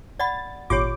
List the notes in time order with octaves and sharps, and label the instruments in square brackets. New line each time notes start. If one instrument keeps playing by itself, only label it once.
[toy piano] D5 F#5 B5 [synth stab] A6
[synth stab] G#1 A#2 D6 [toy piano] F4 G4 C#5